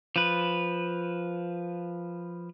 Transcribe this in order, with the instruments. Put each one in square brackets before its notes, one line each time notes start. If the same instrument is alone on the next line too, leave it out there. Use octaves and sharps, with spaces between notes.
[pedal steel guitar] F3 B4